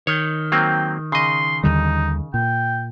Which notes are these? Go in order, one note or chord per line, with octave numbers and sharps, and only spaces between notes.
D#3 C#5
F#3 A#3 C4 G5
C#3 D#5 C6
D#2 D3 G3 D#4
A#2 G5